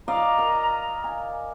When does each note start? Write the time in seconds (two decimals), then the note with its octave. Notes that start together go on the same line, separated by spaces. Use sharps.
0.08 D5 D#5 F5 A#5
0.38 A#4
1.04 G#5